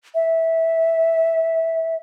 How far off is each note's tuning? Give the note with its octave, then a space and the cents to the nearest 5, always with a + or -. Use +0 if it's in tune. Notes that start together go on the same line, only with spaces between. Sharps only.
E5 -10